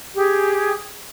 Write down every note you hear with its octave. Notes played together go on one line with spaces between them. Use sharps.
G4 G#4